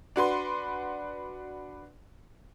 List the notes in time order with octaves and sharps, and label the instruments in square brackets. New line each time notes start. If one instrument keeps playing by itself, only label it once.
[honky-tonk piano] D4 F#4 B4 C6